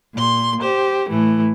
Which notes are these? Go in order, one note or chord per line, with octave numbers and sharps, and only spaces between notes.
A#2 C6
G4 C5
A2 E3 A3